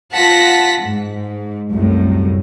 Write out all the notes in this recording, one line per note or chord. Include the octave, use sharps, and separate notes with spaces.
F4 F#5 A5 A#6 B6
G#2
C2 F#2 A2